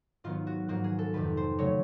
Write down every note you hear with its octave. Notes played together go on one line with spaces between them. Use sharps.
G#2 D#3 F#3 B3 F4
F#4
G#2 F3 A#3 F#4
G#4
A4
F2 C3 D#3 B4
C5
C#3 F#3 A3 C#5